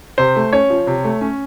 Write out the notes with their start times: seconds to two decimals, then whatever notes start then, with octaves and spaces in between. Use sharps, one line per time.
0.18 C3 C5
0.36 A3
0.53 C#4 C#5
0.70 F3
0.87 C3
1.04 A3
1.21 C#4